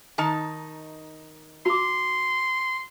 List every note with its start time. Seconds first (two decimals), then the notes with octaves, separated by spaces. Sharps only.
0.18 D#3 D#4 A5
1.66 F#4 C6 D6